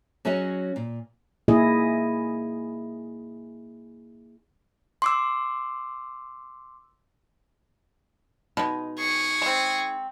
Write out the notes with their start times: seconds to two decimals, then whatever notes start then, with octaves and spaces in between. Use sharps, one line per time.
0.25 F#3 C#4 F#4 G#4 C#5 D#5
0.76 A#2
1.48 A#3 E4 G#4 D#5
5.02 C6 D6 E6
8.57 B2 G#3 D#4
8.98 G#4 C#6
9.42 G#3 C4